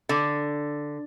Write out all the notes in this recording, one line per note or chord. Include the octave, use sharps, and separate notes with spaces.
D3